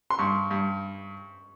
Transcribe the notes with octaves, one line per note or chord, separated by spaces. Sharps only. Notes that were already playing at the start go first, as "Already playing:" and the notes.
C6
G2 C#6
G2